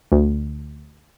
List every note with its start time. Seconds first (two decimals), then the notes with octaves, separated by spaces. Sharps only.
0.12 D2